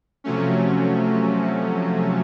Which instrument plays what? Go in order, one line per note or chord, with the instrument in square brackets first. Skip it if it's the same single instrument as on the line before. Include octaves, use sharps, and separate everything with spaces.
[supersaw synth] C3 F3 F#3 A3 C#4